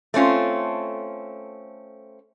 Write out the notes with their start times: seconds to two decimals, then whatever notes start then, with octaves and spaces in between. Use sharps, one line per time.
0.14 A3 C4 C#4 F4